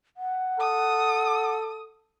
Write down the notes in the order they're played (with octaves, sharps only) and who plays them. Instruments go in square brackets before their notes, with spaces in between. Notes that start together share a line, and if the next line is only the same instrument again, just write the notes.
[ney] F#5
[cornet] A4 [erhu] D#6